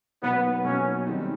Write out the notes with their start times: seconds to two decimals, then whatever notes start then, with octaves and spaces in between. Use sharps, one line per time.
0.22 B2 F#3 A#3 B3 D#4
0.64 B2 F#3 A#3 C#4 D#4
1.06 D#3 G3 C4 D#4